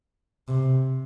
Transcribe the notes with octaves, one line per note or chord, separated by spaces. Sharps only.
C3